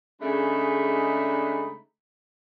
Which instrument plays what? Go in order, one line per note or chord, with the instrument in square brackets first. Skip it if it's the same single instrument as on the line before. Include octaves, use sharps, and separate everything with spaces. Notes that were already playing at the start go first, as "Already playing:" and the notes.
[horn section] C#3 G#3 A3 D4 D#4 B5